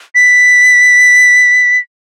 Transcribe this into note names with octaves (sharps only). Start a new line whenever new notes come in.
B6